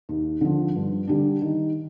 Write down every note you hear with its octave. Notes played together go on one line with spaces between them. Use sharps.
D#2
D3 F3
G2
D3 G3 D4
D#3